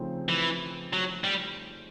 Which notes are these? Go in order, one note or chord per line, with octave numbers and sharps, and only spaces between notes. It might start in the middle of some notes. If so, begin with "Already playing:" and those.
Already playing: C#3 F3 A3 C4 D#4
E3
F#3
G3